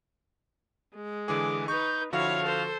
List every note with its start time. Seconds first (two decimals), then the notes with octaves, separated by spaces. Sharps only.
0.95 G#3
1.28 D3 E3 G#4 D6
1.68 D#4 B4 C#6 G6
2.13 D3 F3 E4 F#4 C#5 F5
2.43 A4 C5